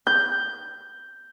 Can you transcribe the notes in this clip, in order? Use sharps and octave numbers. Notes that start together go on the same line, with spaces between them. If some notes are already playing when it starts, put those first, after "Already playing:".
G6